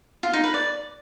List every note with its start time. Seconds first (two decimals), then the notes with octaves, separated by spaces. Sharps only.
0.23 F4
0.33 D#4
0.44 B4
0.54 D5